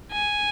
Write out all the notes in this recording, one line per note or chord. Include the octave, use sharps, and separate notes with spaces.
G#5